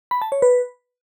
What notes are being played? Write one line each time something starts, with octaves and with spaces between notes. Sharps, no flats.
B5
A5
C#5
B4